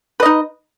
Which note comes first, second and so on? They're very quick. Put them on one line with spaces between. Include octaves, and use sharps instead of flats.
B4 D#5 D#4